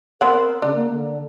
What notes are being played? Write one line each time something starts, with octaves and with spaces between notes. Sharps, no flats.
B3 C4 A#4 F#5
C#3 D4
A#3
D3